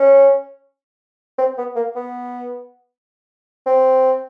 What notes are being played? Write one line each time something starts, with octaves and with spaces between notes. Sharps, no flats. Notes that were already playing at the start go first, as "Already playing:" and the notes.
Already playing: C#4
C4
B3
A#3
B3
C4